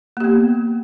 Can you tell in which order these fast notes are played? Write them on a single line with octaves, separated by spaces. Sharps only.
A#3 G4 B3